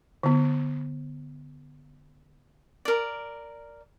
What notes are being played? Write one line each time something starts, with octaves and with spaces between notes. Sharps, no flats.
D3 B3
A#4 D5